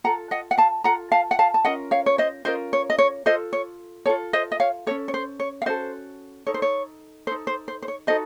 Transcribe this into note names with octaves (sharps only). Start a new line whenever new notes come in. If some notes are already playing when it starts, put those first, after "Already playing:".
F4 A4 F#5 A#5
D#5 F#5
F#5
F5 A5
F4 A4 F#5 A#5
F5 A5
F#5
F5 A5
A5
C#4 F4 A#4 D#5 F#5
C#5 F5
C#5
C5 D#5
C#4 F4 A#4 C5 D#5
C#5
D#5
C#5
F4 A4 C5 D#5
C#5
F4 A4 C#5
C5 D#5
D#5
C#5 F5
C#4 F#4 A4 C#5
C#5
C5
C#5
F5
C#4 F#4 A4 C5 D#5
D#4 A4 C#5
C5
C#5
D#4 A4 C5
C5
C5
C5
C#5
D#4 F#4 A4 C5 D#5